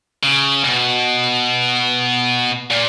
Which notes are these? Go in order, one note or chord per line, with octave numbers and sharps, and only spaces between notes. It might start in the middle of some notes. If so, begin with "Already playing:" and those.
C#3
B2
A#2